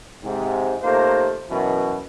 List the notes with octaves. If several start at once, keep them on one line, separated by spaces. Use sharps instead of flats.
G#2 C3
C3 A3 A#3 D#4 F4 C5
F#2 B2 E3